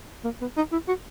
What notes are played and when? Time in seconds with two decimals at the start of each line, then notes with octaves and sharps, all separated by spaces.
0.24 A#3
0.41 B3
0.57 D#4
0.72 E4
0.88 F#4